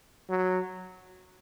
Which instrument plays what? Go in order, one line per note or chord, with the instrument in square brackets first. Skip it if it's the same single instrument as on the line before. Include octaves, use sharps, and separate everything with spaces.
[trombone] F#3